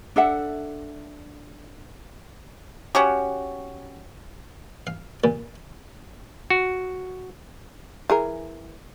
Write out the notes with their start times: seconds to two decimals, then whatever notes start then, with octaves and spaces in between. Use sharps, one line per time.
0.16 D4 A4 E5 F#5
2.95 C#4 F#4 G4
4.87 F5
5.24 A#2
6.50 F#4
8.10 E3 G#4 A#4